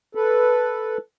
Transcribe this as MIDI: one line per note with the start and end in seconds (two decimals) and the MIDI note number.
0.15 0.98 69
0.15 0.98 71